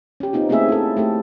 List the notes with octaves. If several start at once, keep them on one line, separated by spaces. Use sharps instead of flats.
C#4 G4
B3 C4 D#4 F4
A3 A#3 C4 C#4 G#4 E5
E4 A4
A3 G4 A4